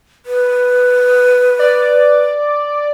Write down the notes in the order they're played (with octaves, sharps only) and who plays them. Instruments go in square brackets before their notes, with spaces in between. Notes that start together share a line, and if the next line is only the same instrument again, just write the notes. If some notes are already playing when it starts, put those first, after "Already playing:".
[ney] B4
[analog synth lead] D5